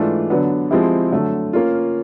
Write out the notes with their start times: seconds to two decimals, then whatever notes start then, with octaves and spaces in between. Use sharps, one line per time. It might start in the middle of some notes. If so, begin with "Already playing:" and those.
Already playing: G#2 E3 A3 D4 F4
0.30 D3 F#3 B3 D4
0.71 F3 G#3 C4 E4 G4
1.12 D3 F#3 A3
1.53 A#3 C#4 F4